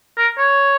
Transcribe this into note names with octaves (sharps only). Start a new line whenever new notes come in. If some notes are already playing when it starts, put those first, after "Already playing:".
A#4
C#5